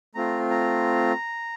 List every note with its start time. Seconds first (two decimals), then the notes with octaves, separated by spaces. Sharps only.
0.15 A3 C4 F4 A#5
0.50 A#5